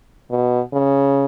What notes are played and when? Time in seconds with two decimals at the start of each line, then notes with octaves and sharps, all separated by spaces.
0.31 B2
0.73 C#3